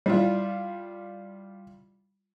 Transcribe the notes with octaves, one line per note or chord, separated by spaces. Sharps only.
G3 E4 F4